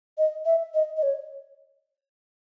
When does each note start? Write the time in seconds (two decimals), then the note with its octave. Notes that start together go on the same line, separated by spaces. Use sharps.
0.18 D#5
0.45 E5
0.74 D#5
0.97 D#5
1.03 C#5